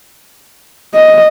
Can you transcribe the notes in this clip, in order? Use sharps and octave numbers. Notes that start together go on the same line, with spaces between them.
D#5